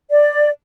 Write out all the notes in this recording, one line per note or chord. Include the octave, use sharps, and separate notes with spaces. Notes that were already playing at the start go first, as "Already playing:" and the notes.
D5